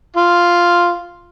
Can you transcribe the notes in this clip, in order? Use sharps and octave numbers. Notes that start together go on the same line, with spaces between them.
F4